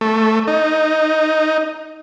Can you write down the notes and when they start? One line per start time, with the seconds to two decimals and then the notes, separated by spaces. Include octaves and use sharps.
0.01 A3
0.48 D#4